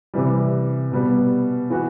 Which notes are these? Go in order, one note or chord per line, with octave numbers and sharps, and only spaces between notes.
C3 E3 G3
B2 G3 B3
E3 B3 F#4